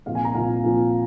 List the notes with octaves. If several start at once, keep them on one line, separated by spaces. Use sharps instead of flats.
C2 A#2 F3 F5
G#5
A#5
C2 A#2 F3 F5
C2 A#2 F3